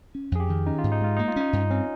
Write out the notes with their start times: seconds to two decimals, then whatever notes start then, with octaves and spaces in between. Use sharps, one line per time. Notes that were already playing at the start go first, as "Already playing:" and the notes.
0.15 C#4
0.32 F2 G#4
0.40 G4
0.49 D#3
0.66 C#4 D#4
0.78 F4
0.84 G#2
0.92 D#4
1.01 G#3 F4
1.17 A#3 D#4
1.28 F4
1.36 C#4 D#4
1.53 G2
1.70 C4 C#4